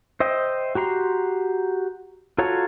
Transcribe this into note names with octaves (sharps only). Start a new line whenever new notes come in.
C5 D#5 E5 G5
F#4 G4 A#5 C6
F4 F#4 A4 C#5 A#5